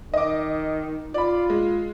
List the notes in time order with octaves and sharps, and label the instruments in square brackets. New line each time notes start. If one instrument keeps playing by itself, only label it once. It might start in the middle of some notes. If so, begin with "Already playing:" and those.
[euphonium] D#3 [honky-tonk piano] D#5 D6
[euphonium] F4 [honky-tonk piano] D5 B5
[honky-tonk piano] G#3